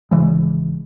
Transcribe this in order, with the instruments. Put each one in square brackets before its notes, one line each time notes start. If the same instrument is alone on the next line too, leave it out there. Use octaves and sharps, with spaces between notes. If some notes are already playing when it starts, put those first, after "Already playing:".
[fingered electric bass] G#1 C#3 E3 G#3